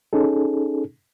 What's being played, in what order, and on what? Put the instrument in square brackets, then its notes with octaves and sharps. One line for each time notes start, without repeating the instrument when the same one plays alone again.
[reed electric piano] C#4 D#4 G#4 A4